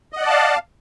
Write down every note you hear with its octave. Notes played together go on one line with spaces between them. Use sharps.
D5 D#5 F5 F#5 A5